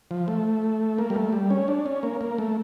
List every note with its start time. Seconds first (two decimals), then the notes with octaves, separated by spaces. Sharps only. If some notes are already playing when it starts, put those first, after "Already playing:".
0.11 F3
0.28 A3
0.98 A#3
1.10 G3
1.16 A3
1.33 G3
1.50 C#4
1.68 D4
1.86 C#4
2.03 A#3
2.21 A#3
2.38 A3